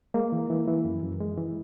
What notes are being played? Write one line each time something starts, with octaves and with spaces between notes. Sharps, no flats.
G#3 A#3
E3
E3
E3
F#2
F#2
G#3
E3